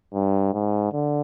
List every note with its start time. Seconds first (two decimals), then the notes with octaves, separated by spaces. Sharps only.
0.14 G2
0.54 G#2
0.93 D3